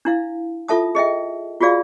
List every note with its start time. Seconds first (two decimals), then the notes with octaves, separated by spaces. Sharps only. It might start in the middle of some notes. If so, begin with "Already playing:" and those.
0.05 D4 E4 F5
0.68 F4 A4 E5 A5 D#6
0.95 G#4 D#5 E5 G5
1.61 F4 F#4 G#4 D5 F5